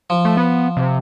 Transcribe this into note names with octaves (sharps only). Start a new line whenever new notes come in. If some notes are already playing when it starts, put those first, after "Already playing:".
F3
A3
B3
C3